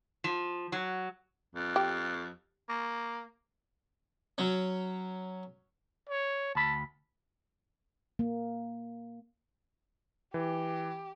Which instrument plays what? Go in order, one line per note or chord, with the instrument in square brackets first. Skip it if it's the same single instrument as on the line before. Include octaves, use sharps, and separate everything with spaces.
[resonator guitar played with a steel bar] F3
F#3
[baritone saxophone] F2
[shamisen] G4
[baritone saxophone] A#3
[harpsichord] F#3 C#4
[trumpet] C#5
[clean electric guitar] D2 B5 [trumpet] A5
[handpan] A#3
[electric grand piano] E3 [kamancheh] G4